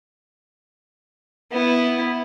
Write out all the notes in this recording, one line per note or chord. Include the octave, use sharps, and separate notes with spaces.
B3 E4